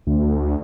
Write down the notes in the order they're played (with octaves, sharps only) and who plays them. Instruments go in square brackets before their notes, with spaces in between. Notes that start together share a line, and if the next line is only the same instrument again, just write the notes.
[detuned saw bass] D2